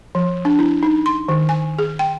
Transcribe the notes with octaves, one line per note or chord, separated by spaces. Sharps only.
F3
D4
E4
D#4
C6
D#3
G#5
G#4
G5